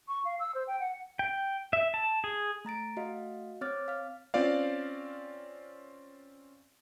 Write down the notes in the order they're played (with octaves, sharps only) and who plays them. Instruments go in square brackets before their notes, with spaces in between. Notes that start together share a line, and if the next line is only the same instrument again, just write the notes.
[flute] C#6
F5
E6
C5
G5
F#5
[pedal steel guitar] G5
E5
A5
G#4
[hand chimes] A3 A#5 A6 D7
A3 F#4 D#5 F5
C4 C#5 D6 F6 A6
F5 F6
[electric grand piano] C4 C#4 F4 D5 F5